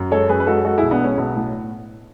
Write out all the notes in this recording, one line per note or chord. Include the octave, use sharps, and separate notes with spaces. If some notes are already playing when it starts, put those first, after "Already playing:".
Already playing: F#2
G#3 A4 C#5
F#2 G#4 B4
B4
G#3 F#4 A4
G#3 F#4 A4
B1 E4 G#4
B3 D4
G#3 C#4
B1 B3
A2